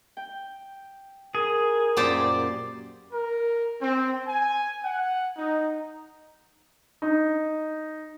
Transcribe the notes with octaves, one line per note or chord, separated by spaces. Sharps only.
G5
G#4 A#4
F#2 A#2 G4 C5 D5 C6
A#4
C4
G#5
F#5
D#4
D#4